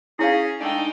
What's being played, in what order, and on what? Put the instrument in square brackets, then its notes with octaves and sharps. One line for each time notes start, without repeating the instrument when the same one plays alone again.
[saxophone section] C#4 G#4 [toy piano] E4 C#5 F5
[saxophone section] G#3 A3 D5 [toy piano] D4 [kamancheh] D#4 G5